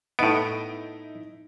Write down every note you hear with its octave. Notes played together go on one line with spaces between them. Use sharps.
A2 B3 D#4 E4 D7